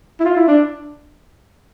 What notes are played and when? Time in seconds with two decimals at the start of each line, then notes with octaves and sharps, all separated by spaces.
0.20 E4
0.25 F4
0.37 E4
0.48 D4